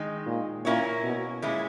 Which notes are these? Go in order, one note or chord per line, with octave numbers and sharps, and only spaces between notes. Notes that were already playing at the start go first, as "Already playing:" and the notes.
Already playing: D#3 G#3 D#4
A#2
A#2 A#3 C#4 E4 A#4 C#5
B2
A#2 G#3 C#4 E4